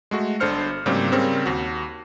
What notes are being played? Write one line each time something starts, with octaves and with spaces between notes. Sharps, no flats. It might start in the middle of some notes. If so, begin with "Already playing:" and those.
G#3 A3 F#4
G1 D4 A4 C5 F6 C#7
G#2 C#3 F#3 G3 A#3 C4
C#3 G3 C4 A#4 C#5
D#2 F#4